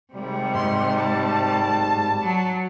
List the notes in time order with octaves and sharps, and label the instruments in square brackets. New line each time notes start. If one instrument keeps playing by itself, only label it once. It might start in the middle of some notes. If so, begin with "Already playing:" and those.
[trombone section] G#1 G3 [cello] C3 G#3
[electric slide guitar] G#2 [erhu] C6
[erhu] A5
[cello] F#3